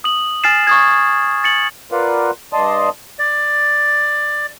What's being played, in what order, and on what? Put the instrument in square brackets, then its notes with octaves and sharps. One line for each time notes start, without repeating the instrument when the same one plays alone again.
[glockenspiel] D#6 F#7
G#5 F6 A6 C7 E7
C#6 D#6 G#6
A6 C#7 F#7
[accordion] F4 A#4 B4 D5 F5 F#5
G2 D5 D#5 A5 C6 D#6
[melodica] D5